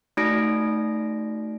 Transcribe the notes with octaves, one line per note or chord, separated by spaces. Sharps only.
A3 D#4 F#4 D5 A#6 D7